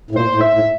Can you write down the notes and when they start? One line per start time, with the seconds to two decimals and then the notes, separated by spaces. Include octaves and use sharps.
0.11 A2
0.15 A#2 C5
0.35 A2
0.41 E5
0.54 A2